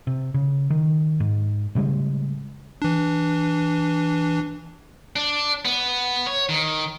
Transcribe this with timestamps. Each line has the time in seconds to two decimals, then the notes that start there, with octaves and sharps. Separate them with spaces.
0.07 C3
0.34 C#3
0.70 D#3
1.20 G#2
1.75 A2 C#3 G3 G#3
2.82 E3 D4
5.16 D4
5.65 B3
6.26 C#5
6.49 D#3